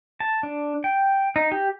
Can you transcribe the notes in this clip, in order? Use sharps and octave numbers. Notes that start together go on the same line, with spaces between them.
A5
D4
G5
D#4
G4